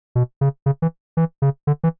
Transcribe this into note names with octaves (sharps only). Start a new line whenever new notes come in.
B2
C#3
C#3
E3
E3
C#3
D3
E3